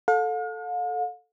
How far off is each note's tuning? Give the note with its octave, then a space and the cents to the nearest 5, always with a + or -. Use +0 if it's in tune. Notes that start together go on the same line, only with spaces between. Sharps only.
A4 +0 F5 +45